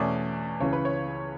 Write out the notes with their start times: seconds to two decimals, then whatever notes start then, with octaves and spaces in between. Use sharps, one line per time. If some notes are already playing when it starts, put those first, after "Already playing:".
Already playing: E2 B2 A3 C#4 D5
0.60 C#2 C#3 E3 C#5
0.73 B4
0.85 C#5